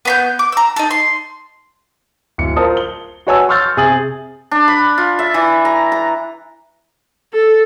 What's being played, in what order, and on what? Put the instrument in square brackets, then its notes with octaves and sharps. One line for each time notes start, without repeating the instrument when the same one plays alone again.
[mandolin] B3 B5 G6
D6
A#5 E6
D#4 A4
C6
[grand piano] D1 C#7
F4 A#4 C5 A5 D#6
G7
F#4 B4 C#5 G#5 A5 E6
C6 C#6 E6 F6 G6 A6
C3 G#4 G#5 D#6 A6 F#7
[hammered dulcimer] D4
B5
F4
E5
E3
A#5
A#5
[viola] A4